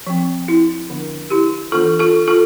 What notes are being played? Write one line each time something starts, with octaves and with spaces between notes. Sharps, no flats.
F3 C4
E4
D3 F3 B3 D4
E4 G4
E3 B3 D4 F4 A4
F4 A4
F4 A4